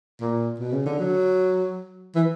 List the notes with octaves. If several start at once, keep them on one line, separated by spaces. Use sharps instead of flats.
A#2
B2
C#3
D3
F#3
E3